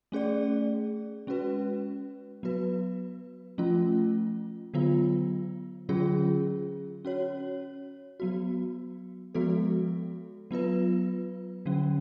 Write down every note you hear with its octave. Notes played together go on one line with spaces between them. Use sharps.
A3 C#4 G#4 D5
G#3 C#4 F#4 B4
F#3 B3 F#4 B4
F3 A3 C#4 F4
D3 F#3 B3 F4
D3 F#3 C#4 F4 G#4
C#4 F#4 C#5
F#3 B3 F#4
F3 G#3 B3 F#4 A4
F#3 B3 F4 B4
D3 F#3 C#4